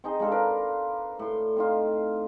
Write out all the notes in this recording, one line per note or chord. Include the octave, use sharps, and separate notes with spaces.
C4 D#4 G#4 D#5
G#3 D4 F4 A4
F4 A#4 B4 D5
A2 C6
C4 D#4 F4